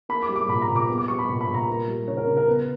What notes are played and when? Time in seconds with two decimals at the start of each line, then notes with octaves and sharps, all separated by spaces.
0.09 A#3 B5
0.22 D6
0.29 G3
0.36 D6
0.48 A#2 B5
0.62 A#5
0.68 A#2
0.76 D6
0.89 B3
0.98 D6
1.08 G3 C#6
1.19 B5
1.29 A#2
1.41 B5
1.48 A#2
1.54 A#5
1.67 A#3
1.88 G3
2.07 C#3 C#5
2.17 A#4
2.27 C#3
2.37 A#4
2.47 B3 B4